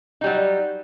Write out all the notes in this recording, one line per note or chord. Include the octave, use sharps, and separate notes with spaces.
F#3 G3 D#4